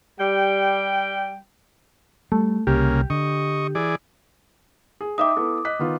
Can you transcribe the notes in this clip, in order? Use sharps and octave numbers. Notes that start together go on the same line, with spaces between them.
G3 G5
G3 A3
C2 C#3 A#3 G4
D3 D#5 C#6
E3 G#4 D5
G#4
D#4 E5 G5 D6 D#6
B3 E4 A4
D#5 F#6 B6
D#3 B3 F4